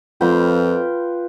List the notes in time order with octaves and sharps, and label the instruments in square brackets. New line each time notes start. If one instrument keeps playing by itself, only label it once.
[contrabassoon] F2 [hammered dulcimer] F4 B4 G5